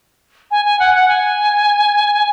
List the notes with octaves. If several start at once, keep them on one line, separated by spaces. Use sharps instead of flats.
G#5
G#5
F#5
F#5
G#5